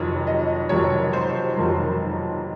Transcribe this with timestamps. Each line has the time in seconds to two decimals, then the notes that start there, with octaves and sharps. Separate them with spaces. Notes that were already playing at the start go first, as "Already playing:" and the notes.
Already playing: F1 F2 D#3 F#3 C#5
0.27 D#5
0.69 F1 F2 D#3 F#3 C#5
1.13 C5
1.56 F1 F2 D#3 F#3